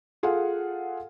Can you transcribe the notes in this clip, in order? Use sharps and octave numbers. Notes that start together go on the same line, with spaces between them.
F4 G#4 A4 F5 F#5